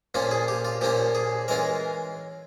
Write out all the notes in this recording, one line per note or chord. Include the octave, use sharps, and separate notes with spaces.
A#2 F3 A#3 C#4 F4
G#4
G4
F4
A#2 F3 A#3 C#4 F4 G4
G#4
E3 G#3 C#4 F4 A#4